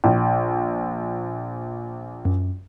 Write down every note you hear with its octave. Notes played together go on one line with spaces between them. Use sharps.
A#1
F#2